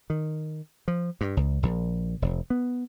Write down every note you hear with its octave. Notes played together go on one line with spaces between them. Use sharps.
D#3
F3
G2
C#2
A#1
F1
B3